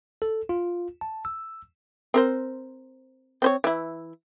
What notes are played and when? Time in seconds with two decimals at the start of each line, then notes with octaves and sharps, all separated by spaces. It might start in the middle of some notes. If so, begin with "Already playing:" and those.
0.22 A4
0.49 F4
1.01 A5
1.25 E6
2.14 C4 A#4 C5
3.42 C4 C5 C#5
3.64 E3 E4